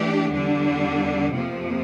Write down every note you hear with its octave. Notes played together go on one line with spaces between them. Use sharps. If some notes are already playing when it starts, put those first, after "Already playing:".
Already playing: E3 A3 D4 G4
E2 D3 G3 D4
F2 C3 F3 A#3